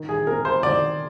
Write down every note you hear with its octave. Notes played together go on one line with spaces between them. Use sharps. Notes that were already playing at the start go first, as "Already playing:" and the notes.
Already playing: D#3
G#4
C4 A#4
C5
D#3 D5